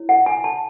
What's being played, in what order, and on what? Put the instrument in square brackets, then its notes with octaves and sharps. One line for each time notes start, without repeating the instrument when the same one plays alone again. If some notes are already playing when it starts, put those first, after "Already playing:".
Already playing: [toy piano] E4 C#5
F#5
G#5
A5